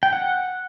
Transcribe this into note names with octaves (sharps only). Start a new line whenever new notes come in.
G5
F#5